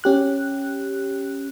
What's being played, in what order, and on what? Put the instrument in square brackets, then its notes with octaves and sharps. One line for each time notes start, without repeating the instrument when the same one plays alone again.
[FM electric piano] C#4 G4 F#6